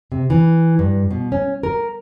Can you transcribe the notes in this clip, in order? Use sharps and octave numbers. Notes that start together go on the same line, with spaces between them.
C3
E3
G2
B2
C#4
A#4